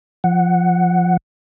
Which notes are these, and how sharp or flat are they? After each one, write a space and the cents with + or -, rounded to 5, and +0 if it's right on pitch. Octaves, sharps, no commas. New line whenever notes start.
F3 +0 F#5 +0